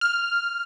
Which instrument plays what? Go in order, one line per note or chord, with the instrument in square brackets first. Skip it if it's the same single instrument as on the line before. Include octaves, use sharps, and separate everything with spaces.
[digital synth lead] F6